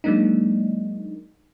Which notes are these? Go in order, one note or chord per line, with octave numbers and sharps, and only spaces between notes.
F#3 G#3 A#3 D4 D#4